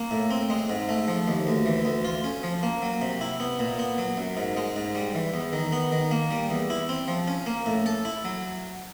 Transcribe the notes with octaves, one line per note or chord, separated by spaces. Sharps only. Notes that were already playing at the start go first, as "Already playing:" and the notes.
Already playing: A#3
A2
C4
G#3
G#2
A3
F3
D#2
D2
E3
D2
F4
C#4
F3
A#3
F#3
C3
E4
B3
A#2
B3
F#3
F#2
G#2
G#3
G#2
G3
E3
E2
D#3
B3
D#3
A#3
G3
E2
E4
C4
F3
C#4
A#3
A2
A4
E4
F#3